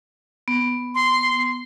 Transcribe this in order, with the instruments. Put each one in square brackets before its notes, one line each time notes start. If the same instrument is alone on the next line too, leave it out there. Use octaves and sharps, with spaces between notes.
[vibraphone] B3
[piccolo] C6